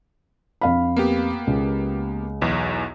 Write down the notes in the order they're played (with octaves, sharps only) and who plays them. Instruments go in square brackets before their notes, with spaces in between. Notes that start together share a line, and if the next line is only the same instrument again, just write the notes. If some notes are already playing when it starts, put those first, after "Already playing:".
[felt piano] F2 F5 B5
[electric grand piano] A#3 B3 G4
[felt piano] C#2
[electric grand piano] B1 E2